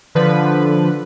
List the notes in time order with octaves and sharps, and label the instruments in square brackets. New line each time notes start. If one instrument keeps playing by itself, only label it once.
[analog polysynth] D3 F3 B4